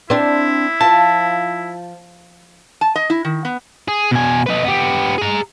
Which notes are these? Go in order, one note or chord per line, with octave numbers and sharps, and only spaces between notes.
C4 D4 E4
F3 A5
A5
D#5
E4
D#3
B3
G#4
B2 G#5
D#4 B4
B3 G4
G#4 A#5